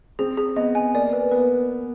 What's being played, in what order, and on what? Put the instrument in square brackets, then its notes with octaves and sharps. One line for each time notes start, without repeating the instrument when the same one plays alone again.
[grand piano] C4 [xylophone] G#4
[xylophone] G#4
[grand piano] B3 [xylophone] D#5
[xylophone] G#5
[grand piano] A#3 [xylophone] D5
[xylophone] B4
[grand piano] B3 [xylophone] B4